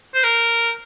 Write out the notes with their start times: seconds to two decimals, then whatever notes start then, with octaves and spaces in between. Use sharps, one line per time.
0.14 C5
0.24 A#4